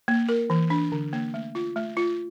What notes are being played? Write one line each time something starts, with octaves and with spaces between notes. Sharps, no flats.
A#3
A#4
E3
D4
D3
A#3
A3
F4
A3
F4